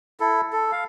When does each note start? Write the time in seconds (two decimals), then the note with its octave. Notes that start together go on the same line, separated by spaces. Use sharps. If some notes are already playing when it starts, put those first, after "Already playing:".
0.20 E4 A4
0.53 A4
0.72 F5